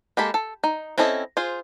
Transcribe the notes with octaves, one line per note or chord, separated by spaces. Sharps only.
G#3 A#3 G4 A4 B5
A4
D#4
C4 C#4 E4 A4 D#5
F4 G#4 C5